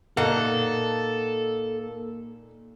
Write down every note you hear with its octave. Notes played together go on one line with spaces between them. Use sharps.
A#2 A#3 D#4 A4 F#5